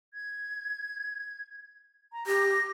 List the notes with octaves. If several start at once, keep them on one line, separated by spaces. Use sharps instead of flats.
G#6
A#5
G4 A#6